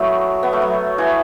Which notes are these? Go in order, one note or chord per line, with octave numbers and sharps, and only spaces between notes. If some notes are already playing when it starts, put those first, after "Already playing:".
Already playing: F#3 A3 B3 E4
B3
A3
F#3
E3